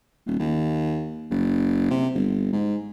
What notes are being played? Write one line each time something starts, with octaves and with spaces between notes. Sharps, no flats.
D#1
D#2
F#1
C3
G1
G#2